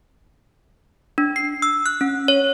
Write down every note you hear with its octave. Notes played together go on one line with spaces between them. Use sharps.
D4
C7
E6
F#6
C#4
C#5